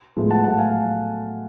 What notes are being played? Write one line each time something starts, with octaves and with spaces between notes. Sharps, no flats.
A2 F3 G#3 B3
F#5 A5
A2 F#3 A3 F#5 A5
F5 G#5